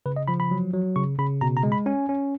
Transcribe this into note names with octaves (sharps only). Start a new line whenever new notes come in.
C#3 B4
D#5
F3 B5
B5
F#3
F#3
C#3 C#6
C#3 B5
B2 A#5
A#5
G#3
B5
C#4 G#5
C#4